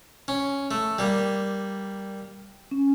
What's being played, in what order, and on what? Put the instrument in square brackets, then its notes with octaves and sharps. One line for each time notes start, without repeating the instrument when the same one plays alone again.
[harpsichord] C#4
A3
G3 A#3
[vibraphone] C#4